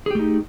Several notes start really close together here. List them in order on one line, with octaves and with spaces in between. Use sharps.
G#4 G4 A3 D#4